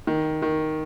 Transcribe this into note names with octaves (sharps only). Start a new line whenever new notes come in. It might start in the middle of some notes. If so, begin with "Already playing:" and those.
D#3
D#3